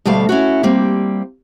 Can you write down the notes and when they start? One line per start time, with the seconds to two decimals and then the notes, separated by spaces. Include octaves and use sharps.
0.05 D2 B2 G3 A3 F5
0.29 C#4 E4 F#4
0.63 G3 A#3 C4